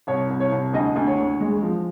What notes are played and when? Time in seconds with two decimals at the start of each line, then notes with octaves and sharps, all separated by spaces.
0.07 C2 C#5
0.30 C2
0.40 C#5
0.52 C2
0.73 D2 D#5
0.96 D2
1.07 C#5
1.19 D2
1.40 G#3
1.63 F3